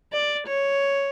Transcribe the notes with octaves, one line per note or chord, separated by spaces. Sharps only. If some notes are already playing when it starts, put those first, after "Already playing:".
D5
C#5